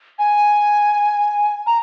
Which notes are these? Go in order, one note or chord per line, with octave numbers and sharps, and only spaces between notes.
G#5
A#5